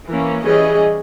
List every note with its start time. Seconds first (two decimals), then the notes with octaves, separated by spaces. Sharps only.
0.09 E3 A#3 C#4
0.43 E3 G3 C#4 G#4 D#5